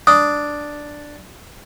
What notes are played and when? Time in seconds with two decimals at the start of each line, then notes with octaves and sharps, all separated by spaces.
0.07 D4 D#6